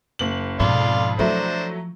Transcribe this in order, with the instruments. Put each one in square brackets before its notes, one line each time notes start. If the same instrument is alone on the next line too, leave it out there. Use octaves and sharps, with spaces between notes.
[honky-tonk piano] F#1 F#7
[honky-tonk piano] F2 [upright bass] G#2 B2 [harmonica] D5 F5 C6
[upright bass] F3 [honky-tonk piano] F#3 A3 E4 [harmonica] D4 C5